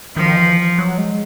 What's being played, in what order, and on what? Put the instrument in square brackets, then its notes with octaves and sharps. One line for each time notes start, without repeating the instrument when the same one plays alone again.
[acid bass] D#3 [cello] F3
[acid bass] E3
F#3
G#3